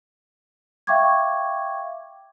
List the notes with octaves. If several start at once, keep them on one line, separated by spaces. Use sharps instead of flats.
E5 F5 G5 C#6 D6 G#6